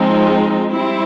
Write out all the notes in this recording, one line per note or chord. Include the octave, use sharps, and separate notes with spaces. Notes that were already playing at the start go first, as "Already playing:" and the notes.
Already playing: F3 G#3 C4 D#4
G3 C4 E4